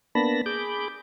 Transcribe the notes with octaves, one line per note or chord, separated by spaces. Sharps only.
A#3 B3 D4 A5 B5 A#6
G#4 B5 D6 G6